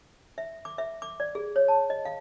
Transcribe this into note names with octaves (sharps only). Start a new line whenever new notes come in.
E5
D6
E5
D6
D5
G#4
C#5
A5
D#5
F5